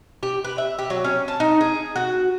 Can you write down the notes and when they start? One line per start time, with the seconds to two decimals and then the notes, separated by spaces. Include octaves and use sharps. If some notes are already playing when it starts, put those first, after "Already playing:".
0.23 G4
0.44 B4
0.58 E5
0.79 G4
0.90 F#3
1.04 C#4
1.28 A5
1.40 D#4
1.61 G#4
1.96 F#4